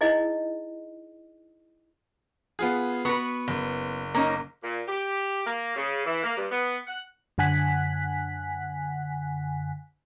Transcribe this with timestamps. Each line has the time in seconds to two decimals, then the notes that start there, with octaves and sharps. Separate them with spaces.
0.01 D#4 E4 G#4 D#5
2.59 B3 F4 G#4
3.05 B3 F#4 B4 C#6
3.48 F#1
4.14 A#3 C#4 D#4
4.62 A#2
4.88 G4
5.46 A#3
5.76 C#3
6.06 E3
6.23 A#3
6.37 G2
6.51 B3
6.87 F#5
7.38 F#2 D3 F#5 G#5 F#6 B6